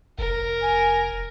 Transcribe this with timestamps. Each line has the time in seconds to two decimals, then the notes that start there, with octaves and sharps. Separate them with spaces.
0.19 F1 A#4
0.62 G#5